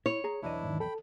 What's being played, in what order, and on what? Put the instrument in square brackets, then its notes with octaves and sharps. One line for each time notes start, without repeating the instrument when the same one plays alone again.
[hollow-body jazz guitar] E4 [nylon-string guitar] C#5
[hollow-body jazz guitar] G#4 A#5
[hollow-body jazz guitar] B1 E2 D#5 [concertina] D4 E4
[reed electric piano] G#2 D#3
[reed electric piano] A4 [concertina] G5 B5